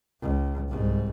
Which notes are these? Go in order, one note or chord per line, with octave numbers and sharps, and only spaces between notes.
C#2
C2 G#2